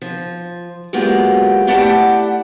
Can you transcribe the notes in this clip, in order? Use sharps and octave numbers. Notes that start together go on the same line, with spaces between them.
F3
F#3 G#3 A#3 B3 F4 G4
A3 E4 G4 D5 F#5 A5